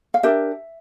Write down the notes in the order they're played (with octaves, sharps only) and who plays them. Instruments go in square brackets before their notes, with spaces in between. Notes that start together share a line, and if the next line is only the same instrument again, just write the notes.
[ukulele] F5
D4 G4 A#4 E5